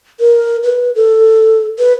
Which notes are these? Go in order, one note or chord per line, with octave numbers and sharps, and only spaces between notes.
A#4
B4
A4
B4